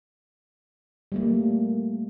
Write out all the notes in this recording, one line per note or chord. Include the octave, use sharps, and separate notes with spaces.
G3 A3 A#3